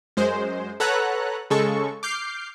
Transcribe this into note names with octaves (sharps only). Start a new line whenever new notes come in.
F#2 G#3 C5
A4 B4 C#5 F#5 A#5 F#6
C#3 G#3 A4 C#6
D6 F6 G6 C7